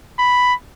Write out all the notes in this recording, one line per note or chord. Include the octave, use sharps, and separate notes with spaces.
B5